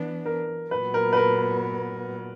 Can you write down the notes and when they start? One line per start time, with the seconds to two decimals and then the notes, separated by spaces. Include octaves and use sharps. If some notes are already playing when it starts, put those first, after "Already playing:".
Already playing: E3 B3 D4
0.25 A#4
0.71 A#2 F#3 B3 B4
0.94 A#4
1.13 B4
1.17 A#4